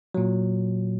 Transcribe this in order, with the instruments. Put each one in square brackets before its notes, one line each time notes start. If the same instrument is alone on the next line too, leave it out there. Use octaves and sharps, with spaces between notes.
[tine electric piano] A#2 F#3